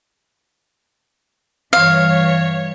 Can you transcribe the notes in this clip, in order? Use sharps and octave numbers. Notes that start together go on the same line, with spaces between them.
G2 E3 C#5 F5